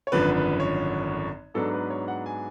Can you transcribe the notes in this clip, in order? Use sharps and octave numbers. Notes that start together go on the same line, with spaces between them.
C#5
G#1 F#2 D3 F3 B4
B4
C#5
G#2 F#3 B3 D4 A4
B4
C#5
F#5
G#5